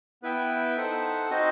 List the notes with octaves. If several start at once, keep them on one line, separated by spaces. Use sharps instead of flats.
B3 E4 B4 E5 G5
D#4 A4 C5 F#5
C4 D#4 F#4 C5 D#5